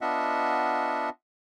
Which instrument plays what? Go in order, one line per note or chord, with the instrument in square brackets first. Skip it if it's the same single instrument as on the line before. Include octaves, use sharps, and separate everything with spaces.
[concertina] B3 D4 F4 D#5 E5 F#5